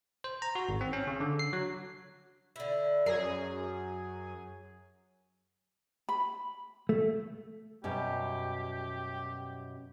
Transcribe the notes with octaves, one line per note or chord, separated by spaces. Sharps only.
C5
A#5
F#4
G#1
C4
C#4
C#3
D3
C7
F#3
D3 E4
F#2 F#3 G#4 A#5
B5
A3
F#2 B2 G3 G4